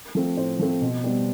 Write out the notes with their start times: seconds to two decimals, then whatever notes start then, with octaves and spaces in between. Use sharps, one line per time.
0.15 F3 A3 C4
0.37 A2 C5
0.59 F3 A3 C4
0.82 B2
1.04 G3 B3